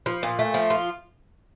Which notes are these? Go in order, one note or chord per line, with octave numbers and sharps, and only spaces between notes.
F3
A#2
A3
F3
F4